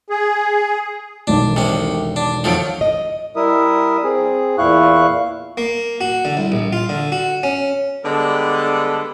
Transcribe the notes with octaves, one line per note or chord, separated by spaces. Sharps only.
G#4
E1 B1 D#3 D4
C2 C3 C4
D4
F2 A2 D#3 F3 F#3 D7
D#5
G3 E4 A#4 E5 D#6
C4 G#4
E2 A#2 E4 F5 C#6 F#6
A#3
F#4
D3
C2
A#1
F4
D3
F#4
C#4
D3 G3 G#3 B3 A4